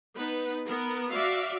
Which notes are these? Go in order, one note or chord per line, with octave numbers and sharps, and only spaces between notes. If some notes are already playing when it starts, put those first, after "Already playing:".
B3 D#4 B4
B3 A#4
F#4 D5 E5 F5